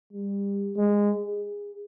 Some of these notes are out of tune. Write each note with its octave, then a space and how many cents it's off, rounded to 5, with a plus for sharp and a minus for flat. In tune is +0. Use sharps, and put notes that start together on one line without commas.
G3 +30
G#3 -15
G#4 -20